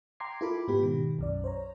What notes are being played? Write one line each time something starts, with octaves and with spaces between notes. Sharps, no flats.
G5 A#5 C6 D6 G#6 C7
E4 F4 A4 A#4 B5 D6
G#2 B3 G4 B5
B2 D#3
B1 F#2 D5
C5 C#5 A#5